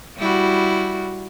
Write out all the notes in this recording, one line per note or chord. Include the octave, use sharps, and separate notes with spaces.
G3 E4 F#4